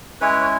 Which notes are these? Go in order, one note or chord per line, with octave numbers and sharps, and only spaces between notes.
G#3 C#4 E4 B4 C#5
C#5